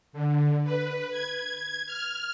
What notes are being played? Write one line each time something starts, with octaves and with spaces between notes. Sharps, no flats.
D3
B4
G#6
F6